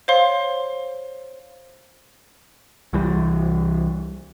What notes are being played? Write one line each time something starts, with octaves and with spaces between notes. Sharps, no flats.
C5 C#5 F5 C6
C2 E3 G3